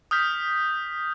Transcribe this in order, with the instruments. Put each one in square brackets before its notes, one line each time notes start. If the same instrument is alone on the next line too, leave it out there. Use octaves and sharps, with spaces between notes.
[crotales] D#6 F6 G6 B6